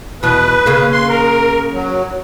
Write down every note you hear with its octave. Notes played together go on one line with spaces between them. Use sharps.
E2 B2 B4
C#3 A#3
C6
A#4
F#3